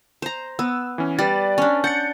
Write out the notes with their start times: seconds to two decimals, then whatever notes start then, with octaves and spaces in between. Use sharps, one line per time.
0.22 C5 A#5
0.59 B3 E6
0.98 E3 C#4
1.19 G3 B4 D5 A6
1.58 C#4 D4
1.84 F#5 G6 A6 C#7